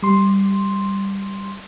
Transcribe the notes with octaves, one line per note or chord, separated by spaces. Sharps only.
G3 C6